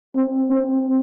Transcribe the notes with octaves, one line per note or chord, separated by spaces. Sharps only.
C4
C4